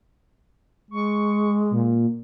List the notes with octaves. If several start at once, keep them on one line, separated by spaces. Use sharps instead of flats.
G#3 C#6
A#2